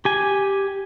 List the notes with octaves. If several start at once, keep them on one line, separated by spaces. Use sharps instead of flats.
G4 G#5